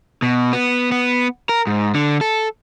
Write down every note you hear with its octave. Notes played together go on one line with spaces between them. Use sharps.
B2
B3
B3
A#4
G#2
D3
A4